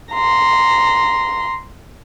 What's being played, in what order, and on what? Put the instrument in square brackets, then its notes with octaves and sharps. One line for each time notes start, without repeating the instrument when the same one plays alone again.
[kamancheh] A#5 C6